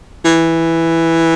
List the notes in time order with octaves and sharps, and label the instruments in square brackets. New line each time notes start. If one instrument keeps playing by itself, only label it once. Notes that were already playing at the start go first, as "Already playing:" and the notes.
[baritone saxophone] E3